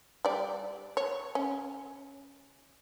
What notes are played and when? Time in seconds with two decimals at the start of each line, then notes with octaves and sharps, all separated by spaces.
0.25 G3 D5
0.97 C#5
1.35 C#4